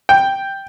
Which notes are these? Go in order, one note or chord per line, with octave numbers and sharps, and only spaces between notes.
G5